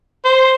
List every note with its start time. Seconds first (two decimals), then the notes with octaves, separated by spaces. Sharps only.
0.25 C5